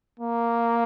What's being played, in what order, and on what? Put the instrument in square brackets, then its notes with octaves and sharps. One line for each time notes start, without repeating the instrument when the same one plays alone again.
[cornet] A#3